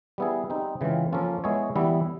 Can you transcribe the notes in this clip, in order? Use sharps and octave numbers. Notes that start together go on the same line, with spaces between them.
G3 B3 E4 G#4
G3 C4 D#4
C#3 E3 G#3 C4 F4
F3 A#3 C#4 F4 A4
G#3 B3 E4 G#4 C#5
E3 G3 B3 E4